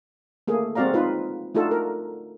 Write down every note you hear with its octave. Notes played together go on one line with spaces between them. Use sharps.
A3 A#3 G#4
G#3 C4 F#4 D5 F5 A#5
D#4 F4 B4
A3 D4 D#4 F4 F#4 A4
A#4